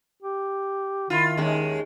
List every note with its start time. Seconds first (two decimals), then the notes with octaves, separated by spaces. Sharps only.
0.23 G4
1.10 D#3 E4 F4
1.37 D#2 G#3 C#4